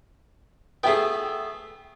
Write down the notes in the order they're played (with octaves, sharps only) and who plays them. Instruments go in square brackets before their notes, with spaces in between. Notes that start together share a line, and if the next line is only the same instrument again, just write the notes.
[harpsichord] A3 B3 [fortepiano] G#4 E5 G5